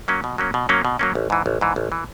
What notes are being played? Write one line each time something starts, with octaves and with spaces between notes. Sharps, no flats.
F#3 A#3 C#4
B2
F#3 A#3 C#4
B2
F#3 A#3 C#4
B2
F#3 A#3 C#4
A1
G#2 E3
A1
G#2 E3
A1
E3